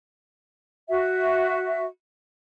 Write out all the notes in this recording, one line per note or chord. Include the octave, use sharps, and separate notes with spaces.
F#4 E5